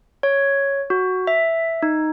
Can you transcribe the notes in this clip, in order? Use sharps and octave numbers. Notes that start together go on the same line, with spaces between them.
C#5
F#4
E5
D#4